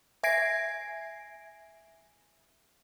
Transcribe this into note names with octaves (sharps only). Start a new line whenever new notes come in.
E5 G#5 G#6 A#6 C7 D7